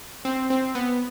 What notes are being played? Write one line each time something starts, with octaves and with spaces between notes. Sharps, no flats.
C4
C4
B3